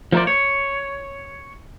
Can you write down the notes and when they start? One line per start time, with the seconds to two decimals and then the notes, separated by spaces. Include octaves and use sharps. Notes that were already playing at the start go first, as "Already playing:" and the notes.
0.12 F3 A3 A#4 C5 D5
0.27 C#5